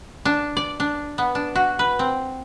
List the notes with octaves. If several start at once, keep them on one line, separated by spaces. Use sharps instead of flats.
D4
D5
D4
B3
D4
F#4
B4
C4